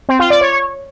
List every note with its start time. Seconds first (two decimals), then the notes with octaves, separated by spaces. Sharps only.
0.09 C4
0.19 F4
0.30 D5
0.41 C#5